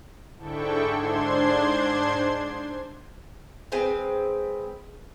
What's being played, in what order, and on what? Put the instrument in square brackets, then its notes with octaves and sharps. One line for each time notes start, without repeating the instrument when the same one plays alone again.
[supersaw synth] G#2 D3 E4 A4 G5 C#6
G#2 D4 C5 C6 G#6
[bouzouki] G#3 C4 B4